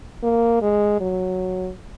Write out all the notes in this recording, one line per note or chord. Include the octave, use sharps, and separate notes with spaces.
A#3
G#3
F#3